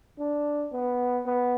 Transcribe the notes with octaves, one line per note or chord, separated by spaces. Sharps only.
D4
B3
B3